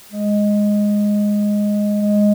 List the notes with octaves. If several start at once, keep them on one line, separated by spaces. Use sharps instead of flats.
G#3
G#3